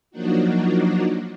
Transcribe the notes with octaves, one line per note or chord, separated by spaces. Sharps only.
F3 F#3 A#3 D4 D#4 F#4